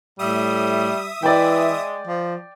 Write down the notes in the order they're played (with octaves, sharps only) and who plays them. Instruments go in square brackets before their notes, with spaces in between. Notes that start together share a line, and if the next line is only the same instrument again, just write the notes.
[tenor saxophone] A2 [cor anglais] G3 [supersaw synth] E5 D#6
[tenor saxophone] E3 [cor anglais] G#3 [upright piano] D5 G5
[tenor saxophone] F3